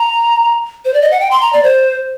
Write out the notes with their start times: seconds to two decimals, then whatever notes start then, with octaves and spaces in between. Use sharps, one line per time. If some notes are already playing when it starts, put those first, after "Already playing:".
Already playing: A#5
0.85 C5
0.94 D5
1.02 D#5
1.11 F#5
1.20 G5
1.31 C6
1.42 A#5
1.53 D5
1.64 C5